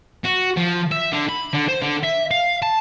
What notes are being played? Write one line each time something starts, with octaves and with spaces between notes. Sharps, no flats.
F#4
F3
E5
D3
B5
D3
C5
D3
E5
F5
A5